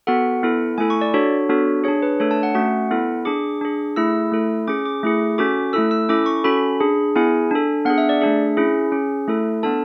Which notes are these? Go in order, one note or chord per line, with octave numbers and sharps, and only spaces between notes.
B3 F#4 A4 F#5
B3 E4 A4
A3 E4 A4 G#5
C#6
D5
D4 F#4 A4 C#5
B3 D4 F#4 A4
D4 G#4 C#5
B4
A3 D4 A4 C#5
A5
F#5
A3 C#4 F#4 F#5
B3 E4 A4
D4 G#4 D6
D4 G#4
A3 E4 G#4 E6
A3 E4 A4
C#4 G#4 D6
D6
A3 E4 G#4
C#4 F#4 A4 D6
A3 E4 A4 E6
E6
C#4 E4 A4 D6
C#6
C#4 F#4 A4 B5
D4 G#4
B3 E4 G#4 G#5
D4 A4
B3 D4 G#4 F#5
E5
D5
A3 D4 G#4 E5
C#4 E4 G#4
C#4 G#4
A3 E4 A4
B3 D4 A4 A5